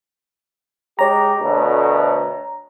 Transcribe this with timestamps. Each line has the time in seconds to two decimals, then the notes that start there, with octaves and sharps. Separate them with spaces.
0.99 G#3 G4 C#5 A#5
1.42 D2 B2 A3